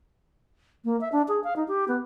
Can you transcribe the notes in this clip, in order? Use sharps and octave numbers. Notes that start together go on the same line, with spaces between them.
A#3
E5
D4
G#4
F5
D#4
G4
B3